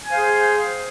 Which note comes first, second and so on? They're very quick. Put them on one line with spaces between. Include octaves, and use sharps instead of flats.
G#5 C5 F5 G#4 G5